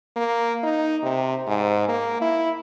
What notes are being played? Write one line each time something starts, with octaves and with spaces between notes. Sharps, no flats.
A#3
D#4
C3
G#2
A#3
E4